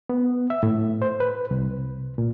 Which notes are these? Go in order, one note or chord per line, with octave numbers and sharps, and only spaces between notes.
B3
E5
A2
C5
B4
C2
A#2